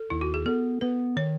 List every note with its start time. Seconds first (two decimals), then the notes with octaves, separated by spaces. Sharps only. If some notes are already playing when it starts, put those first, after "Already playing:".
Already playing: A4
0.10 D#2 E4
0.21 F#4
0.34 G#4
0.46 B3 A4
0.81 B3 B4
1.16 D#3 C#5